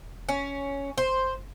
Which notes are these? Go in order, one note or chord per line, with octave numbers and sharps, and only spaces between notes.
E1
C#4
F#1 C5